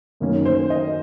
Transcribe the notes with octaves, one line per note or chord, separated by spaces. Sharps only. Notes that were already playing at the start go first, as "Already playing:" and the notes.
F#2 D#3 A#3 C#4
C5
D#5